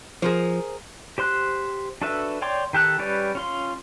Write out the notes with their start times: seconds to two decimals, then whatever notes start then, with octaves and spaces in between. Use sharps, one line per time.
0.22 F3 G#4 A#4 C5
1.18 G4 C5 C6 F#6
2.02 D4 F#4 A4 B4 E5
2.42 C#5 D5 G5 C6 D6
2.73 D#3 G4 A4 F#6
2.99 G3 C#4 G4 B4 D5
3.35 C#4 F4 C6